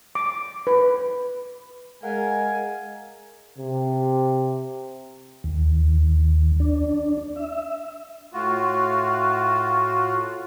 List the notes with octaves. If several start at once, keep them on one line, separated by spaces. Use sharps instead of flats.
D6
B4
G#3 A#4 F5 F#5 G#5
C3
D#2
D4
E5
A2 F4 F#4